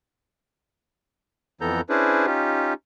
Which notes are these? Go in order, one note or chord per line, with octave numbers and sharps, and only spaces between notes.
F2 E3 B3 A4 A#5 G6
C#4 D4 E4 G#4 B4 C5
C#4 D#4 F4 G4